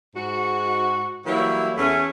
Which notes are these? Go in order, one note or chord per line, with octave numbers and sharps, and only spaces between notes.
G#2 F#4
E3 F#3 G3 A#3 E4
E2 A3 C#4